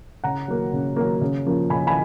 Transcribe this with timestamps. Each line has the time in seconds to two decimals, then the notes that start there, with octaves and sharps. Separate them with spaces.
0.24 C#3 F#5 A#5
0.48 F#3 A#3
0.73 C#3
0.96 F#3 A#3
1.21 C#3
1.46 F3 A#3 C#4
1.70 C#3 G#5 B5
1.87 G#5 B5